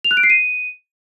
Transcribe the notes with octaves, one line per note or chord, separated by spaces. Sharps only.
F7
F#6
D7
C7
D#7